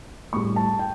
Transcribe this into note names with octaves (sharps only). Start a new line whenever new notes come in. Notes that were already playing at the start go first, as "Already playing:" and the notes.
A2 G3 C#6
A5
G5